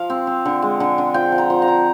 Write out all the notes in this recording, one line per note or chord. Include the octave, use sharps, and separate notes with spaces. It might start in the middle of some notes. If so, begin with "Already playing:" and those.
Already playing: F3 F5
C4
C4
D3
G#3
D3
D3
F3 G5
F3
A#5
F3
A#5
F3